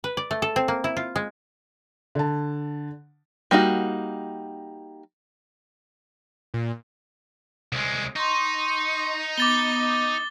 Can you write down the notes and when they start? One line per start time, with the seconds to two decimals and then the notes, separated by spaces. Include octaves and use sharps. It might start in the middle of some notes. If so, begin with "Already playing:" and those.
0.04 B4
0.17 D5
0.31 A3
0.42 A4
0.56 C4
0.68 A#3
0.84 E4
0.97 F4
1.16 G#3
2.15 D3 A5
3.51 G3 A#3 D#4 F#4
6.54 A#2
7.73 C2 G#3
8.16 D#4 C6 C#6
9.38 B3 D6 A6 G7